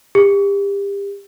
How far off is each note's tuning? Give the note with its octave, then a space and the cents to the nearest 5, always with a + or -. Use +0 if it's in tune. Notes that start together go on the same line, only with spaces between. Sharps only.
G4 +30